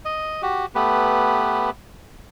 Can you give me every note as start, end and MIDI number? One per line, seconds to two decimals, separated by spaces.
0.05 0.42 75
0.42 0.66 66
0.42 0.66 67
0.75 1.70 57
0.75 1.70 59
0.75 1.70 67
0.75 1.70 71